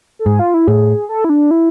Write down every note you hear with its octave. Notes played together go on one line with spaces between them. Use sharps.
A4
G#2 G#4
F4
E4
A2 G#4
A4
E4
D4
E4